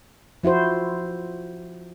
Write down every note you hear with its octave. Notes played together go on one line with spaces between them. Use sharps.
F3 E4 F#4 C5